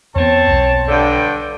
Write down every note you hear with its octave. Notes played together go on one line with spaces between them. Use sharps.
E2 B3 C4 C#5 A5
B1
G2 D3 G5